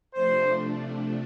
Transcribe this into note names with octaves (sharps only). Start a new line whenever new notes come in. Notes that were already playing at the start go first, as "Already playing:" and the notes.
C3 F3 A3 D4 C5